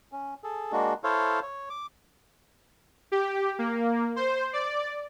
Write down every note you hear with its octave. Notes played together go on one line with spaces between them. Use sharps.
C#4
G#4 A4
G#3 A#3 D4 F#4
E4 A4 C5 C#5 F5
C#5
D6
G4
A#3
C5
D5